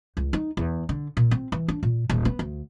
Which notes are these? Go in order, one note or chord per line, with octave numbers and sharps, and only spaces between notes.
C#2
D#4
E2
D3
A#2
C4
E3
D4
A#2
D#1
B3
D2